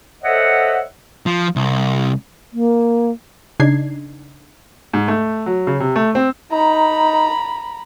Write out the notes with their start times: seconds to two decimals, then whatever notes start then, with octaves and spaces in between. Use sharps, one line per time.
0.23 A4 C5 C#5 D#5 E5 F#5
1.26 F3
1.56 C2
2.53 A#3
3.60 C#3 D4 D#4 G#6 C7
4.93 G#2
5.08 A3
5.46 F#3
5.67 C#3
5.80 C3
5.96 A3
6.15 C4
6.52 D#4 A#5 B5